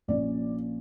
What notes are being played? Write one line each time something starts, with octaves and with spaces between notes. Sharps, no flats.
A#1 A#2 A#3 C#4 D5